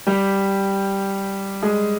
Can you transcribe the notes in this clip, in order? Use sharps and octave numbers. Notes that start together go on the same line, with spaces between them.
G3 G4
G#3 G#4